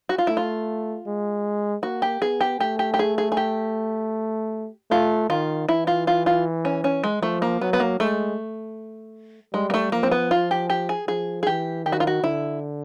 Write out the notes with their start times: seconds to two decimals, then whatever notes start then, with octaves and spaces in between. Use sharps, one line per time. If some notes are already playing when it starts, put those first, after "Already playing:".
0.09 F#4
0.18 F4
0.27 A3 E4
0.37 F4
1.06 G#3
1.83 A#3 F#4
2.02 G4
2.21 B3 G#4
2.41 G4
2.60 A3 G4
2.79 G4
2.94 G4
2.99 G#4
3.18 G#4
3.32 G#4
3.37 G4
4.91 A3 F4
5.29 D#3 F4
5.69 E3 E4
5.87 F4
6.07 F4
6.26 F4
6.65 C#4
6.84 C#4
7.04 G#3
7.22 F3 A3
7.42 A#3
7.61 F#3 B3
7.73 B3
7.80 A#3
8.00 G#3 A3
9.54 G3 G#3
9.70 A#3
9.74 A3
9.92 F3 A#3
10.03 C4
10.11 B3
10.31 F4
10.51 G4
10.70 G4
10.89 G#4
11.08 F3 G#4
11.43 G#4
11.47 E3 G4
11.85 D#3 G4
11.92 F#4
12.00 F4
12.07 F#4
12.23 D3 E4